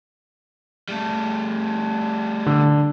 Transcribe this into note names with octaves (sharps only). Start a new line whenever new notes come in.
G3 A3
D3